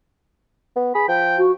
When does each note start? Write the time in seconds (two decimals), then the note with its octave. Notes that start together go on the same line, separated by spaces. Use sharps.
0.76 B3
0.95 G#4 B5
1.08 F3 G5
1.38 F#4